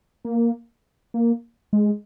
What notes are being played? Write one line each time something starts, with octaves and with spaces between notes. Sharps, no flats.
A#3
A#3
G#3